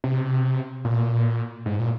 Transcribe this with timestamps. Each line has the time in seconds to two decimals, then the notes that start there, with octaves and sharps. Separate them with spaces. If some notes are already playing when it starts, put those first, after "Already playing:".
0.04 C3
0.85 A#2
1.66 G#2
1.79 A#2